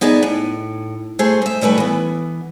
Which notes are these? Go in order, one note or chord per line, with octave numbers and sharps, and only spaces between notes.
B3 D#4 G#4 D5 E5
A2
A3 G#4 C5
G#3 E5
D#2 G3 A3 B4 G#5
E3 B3